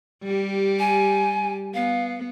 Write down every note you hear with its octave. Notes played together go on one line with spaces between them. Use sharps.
G3 G4
G#5
B3 F5